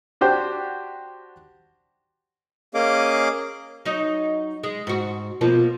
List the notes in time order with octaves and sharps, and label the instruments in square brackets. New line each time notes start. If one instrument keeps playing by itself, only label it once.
[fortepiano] D4 F#4 G4 C5 G5
[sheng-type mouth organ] A#3 C#4 G#4 D#5 F5 D6
[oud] F#3 D#4 D#5
G#3
G#2 F#4
B2 F3 A#3